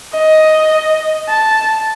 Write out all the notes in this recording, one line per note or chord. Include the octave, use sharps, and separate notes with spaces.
D#5
A5